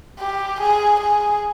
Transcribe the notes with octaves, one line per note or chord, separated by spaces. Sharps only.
G4
G#4
G#4